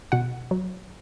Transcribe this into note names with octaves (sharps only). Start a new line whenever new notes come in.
B2 F#5
F#3